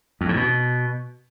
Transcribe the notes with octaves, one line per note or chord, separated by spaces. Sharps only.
F2
G#2
B2